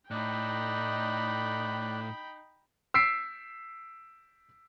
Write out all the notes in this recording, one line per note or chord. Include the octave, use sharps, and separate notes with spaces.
A2 D#4 D5 G5 B5 F#6
E6 B6 C7 D7